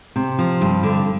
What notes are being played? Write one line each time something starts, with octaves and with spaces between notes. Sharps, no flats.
C3
F3
G2
D3